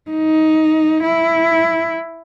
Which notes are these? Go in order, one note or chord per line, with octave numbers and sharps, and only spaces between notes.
D#4
E4